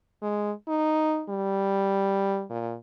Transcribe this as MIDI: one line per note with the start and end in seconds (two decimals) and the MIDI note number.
0.22 0.52 56
0.68 1.23 63
1.30 2.44 55
2.50 2.75 46